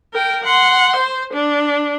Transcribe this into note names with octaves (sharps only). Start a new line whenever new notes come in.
A#4 G5
F#5 C6
C5
D4